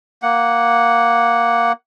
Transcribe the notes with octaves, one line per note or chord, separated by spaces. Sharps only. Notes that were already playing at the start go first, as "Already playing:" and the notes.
A#3 F#5